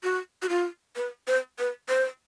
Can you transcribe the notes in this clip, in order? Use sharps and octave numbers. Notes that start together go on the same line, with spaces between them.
F#4
F#4
F4
B4
C5
B4
C5